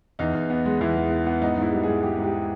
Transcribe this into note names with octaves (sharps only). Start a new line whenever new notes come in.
E2 D#4
E2
B3
G#3
E2 E4
G#3
B3
B3
G#2 D#4
G#2 E4
G3
G#2 G#4
G3 G4
G#2
G4